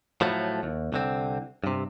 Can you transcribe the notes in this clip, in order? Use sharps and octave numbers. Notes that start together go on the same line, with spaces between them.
A2 F3 F#3 A3
D#2
C2 D3 C4
G2 C3